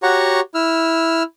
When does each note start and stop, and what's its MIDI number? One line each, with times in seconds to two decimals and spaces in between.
0.03 0.40 66
0.03 0.40 67
0.03 0.40 73
0.03 0.40 78
0.03 0.40 82
0.03 0.40 85
0.55 1.23 64
0.55 1.23 88
0.55 1.23 89